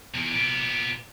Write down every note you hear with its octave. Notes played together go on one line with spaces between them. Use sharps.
E2
A#2 B3